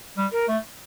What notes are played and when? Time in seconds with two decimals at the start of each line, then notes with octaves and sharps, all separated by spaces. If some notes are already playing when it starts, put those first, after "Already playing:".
0.17 G3
0.32 A#4
0.48 A3